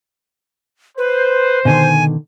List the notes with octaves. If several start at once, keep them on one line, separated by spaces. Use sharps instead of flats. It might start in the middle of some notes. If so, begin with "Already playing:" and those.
B4 C5
B2 D3 D#3 G#5